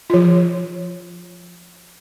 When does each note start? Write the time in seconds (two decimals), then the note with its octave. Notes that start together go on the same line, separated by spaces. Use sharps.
0.10 F3 F4